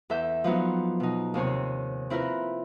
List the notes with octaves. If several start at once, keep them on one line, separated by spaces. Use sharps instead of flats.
E2 A4 E5 G6
F3 F#3 B3 D#4
B2 D#4
D#2 C3 C4 C#5
C4 E4 F4 A#4 B4